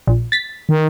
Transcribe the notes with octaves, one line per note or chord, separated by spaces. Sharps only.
A#1
A6 B6
D#3